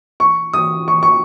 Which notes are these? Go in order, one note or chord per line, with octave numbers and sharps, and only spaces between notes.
C#6
D#6
C#6
C#6